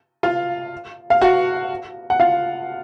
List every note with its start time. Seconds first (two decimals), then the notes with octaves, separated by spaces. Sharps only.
0.23 F4 F5
1.10 F5
1.22 F#4 F#5
2.10 F#5
2.20 F4 F5